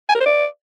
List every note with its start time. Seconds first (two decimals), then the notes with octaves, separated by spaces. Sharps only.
0.09 G#5
0.15 A#4
0.20 C5
0.26 D5